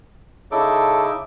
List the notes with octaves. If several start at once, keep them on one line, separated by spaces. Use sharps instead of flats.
C#3 D#4 E4 A4 D6